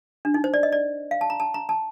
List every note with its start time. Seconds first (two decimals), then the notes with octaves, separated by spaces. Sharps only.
0.25 D4
0.34 D#4
0.44 C5
0.54 D5
0.63 D#5
0.72 D5
1.11 F5
1.21 A5
1.30 A#5
1.40 A5
1.54 A#5
1.69 A5